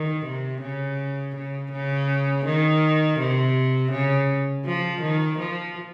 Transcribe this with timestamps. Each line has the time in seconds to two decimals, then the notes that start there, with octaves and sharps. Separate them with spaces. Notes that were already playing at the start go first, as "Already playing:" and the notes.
Already playing: D#3
0.25 C3
0.62 C#3
1.36 C#3
1.72 C#3
2.46 D#3
3.20 C3
3.92 C#3
4.66 F3
5.02 D#3
5.39 F3